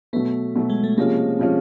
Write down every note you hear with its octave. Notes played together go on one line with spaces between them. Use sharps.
B2 F#3 A3 B3
B2 F#3 A3
G#3
A3
C3 F3 G#3 A#3 C#4
C3 F3 G#3 C#4